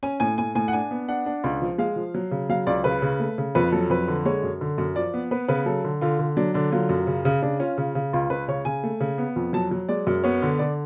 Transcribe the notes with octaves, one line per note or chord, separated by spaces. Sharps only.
C#4 G#5
A2 G#5
A2 G#5
A2 G#5
F#5
D4 G#5
B3
D4 F#5
D4
C#2
F3
G#3 F5
F3
F#3
C#3
F#3 F5
C#2 D5
C#3 B4
C#3
A3
C#3
F2 B4
F#3 A4
F2 B4
D3
G#3 C#5
F#2
D3
F#2
F3 D5
B3
B3 B4
C#3 B4
F#3 A4
D3
D3 F4
D3
F#3 D4
D3 D4
F#3 F4
F#2
C#3
C#3
C#3 D4
C#4 F4
C#3
C#3
C#2 F4
C#2 B4
C#3 C#5
C#3 G#5
A3
C#3
B3
F2
F#3 A5
F#3
G#3 D5
F#2
B3 C#5
D3
D3 D5